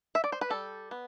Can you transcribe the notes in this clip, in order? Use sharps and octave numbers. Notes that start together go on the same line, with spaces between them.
E5
D5
C5
B4
G3 A4
B3